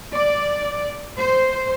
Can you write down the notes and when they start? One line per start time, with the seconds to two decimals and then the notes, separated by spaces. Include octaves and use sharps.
0.12 D5
1.16 C5